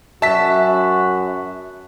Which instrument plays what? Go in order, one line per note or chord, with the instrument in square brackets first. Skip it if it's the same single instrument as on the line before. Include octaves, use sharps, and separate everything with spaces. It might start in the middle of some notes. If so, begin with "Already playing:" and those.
[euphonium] F#2 [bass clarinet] F#4 [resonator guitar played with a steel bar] E5 [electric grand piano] A5 B6